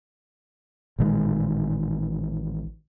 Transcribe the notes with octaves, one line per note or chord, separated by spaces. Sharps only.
A1 A#2 D#3 G#3